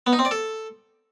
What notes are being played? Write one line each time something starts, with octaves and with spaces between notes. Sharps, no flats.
B3
D#4
C4
D5
A4